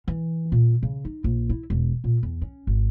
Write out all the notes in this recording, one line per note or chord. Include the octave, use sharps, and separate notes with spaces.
E3
A#2
C#3
D#4
A#1
E4
E1
A#2
E2
C#4
G#1